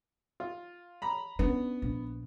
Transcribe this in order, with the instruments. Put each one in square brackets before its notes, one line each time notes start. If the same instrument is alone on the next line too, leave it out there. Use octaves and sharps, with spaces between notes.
[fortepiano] F4
A#5 B5
[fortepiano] B3 [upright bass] C#4 D4
[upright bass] A#1